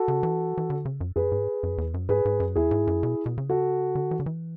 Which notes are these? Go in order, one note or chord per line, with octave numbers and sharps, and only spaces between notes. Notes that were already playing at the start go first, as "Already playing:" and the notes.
Already playing: F#4 A4
C#3
E3
E3
D3
C#3
F#2
F#2 G#4 B4
G#2
F#2
E2
F#2
G#2 G#4 B4
G#2
F#2
E2 E4 G#4
G#2
F#2
B2
B2
C#3
F#4 A4
D3
E3
D3
E3